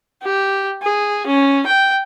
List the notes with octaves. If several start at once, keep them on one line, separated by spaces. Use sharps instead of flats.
G4
G#4
C#4
G5